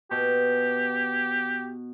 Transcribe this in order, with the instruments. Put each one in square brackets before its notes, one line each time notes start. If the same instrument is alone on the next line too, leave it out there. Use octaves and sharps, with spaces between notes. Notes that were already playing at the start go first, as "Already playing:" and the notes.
[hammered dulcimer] B2 [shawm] G4